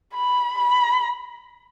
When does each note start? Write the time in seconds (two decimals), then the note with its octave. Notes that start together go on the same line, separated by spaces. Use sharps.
0.14 B5
0.58 B5